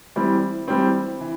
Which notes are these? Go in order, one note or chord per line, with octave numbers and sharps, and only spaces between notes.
E3 G3 C4
E3 G3 C4
E3